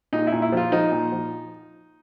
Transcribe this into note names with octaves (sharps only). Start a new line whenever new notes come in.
A#2 D#4
E4
A#2
E4
F3 F4
F3 D#4
A#2
F3